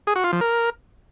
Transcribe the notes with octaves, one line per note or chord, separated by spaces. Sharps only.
G#4
F#4
F4
F3
A#4